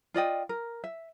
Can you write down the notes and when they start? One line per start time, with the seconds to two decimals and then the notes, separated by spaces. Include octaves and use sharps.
0.14 F4 D5 D#5 G5
0.49 A#4
0.84 E5